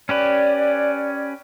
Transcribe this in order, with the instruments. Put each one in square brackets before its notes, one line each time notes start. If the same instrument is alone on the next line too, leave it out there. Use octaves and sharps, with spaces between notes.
[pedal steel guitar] C#4 G4 B4 [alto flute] D5